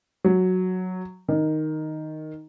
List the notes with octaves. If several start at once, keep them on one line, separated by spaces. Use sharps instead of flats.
F#3
D#3